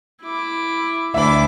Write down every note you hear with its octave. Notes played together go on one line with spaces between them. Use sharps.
E4 D6
D2 D4 E5 B5 D6